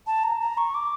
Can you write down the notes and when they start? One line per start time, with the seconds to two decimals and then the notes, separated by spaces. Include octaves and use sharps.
0.07 A5
0.23 A#5
0.40 A#5
0.57 C#6
0.74 D6